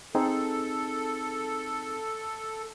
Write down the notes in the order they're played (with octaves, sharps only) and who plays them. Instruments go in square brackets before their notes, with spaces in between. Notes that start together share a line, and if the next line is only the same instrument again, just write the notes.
[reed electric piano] C4 D#4 G#4 [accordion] A4